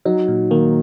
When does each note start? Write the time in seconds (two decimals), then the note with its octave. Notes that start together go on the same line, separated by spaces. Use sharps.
0.05 F#3 D#4
0.28 A#2
0.51 D#3 A#3